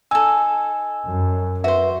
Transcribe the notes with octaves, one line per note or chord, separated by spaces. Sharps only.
D#4 A4 G#5 E6
F#2
F#4 B4 C5 E5